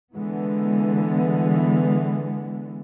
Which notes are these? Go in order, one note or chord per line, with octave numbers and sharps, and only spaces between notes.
D3 E3 G#3 B3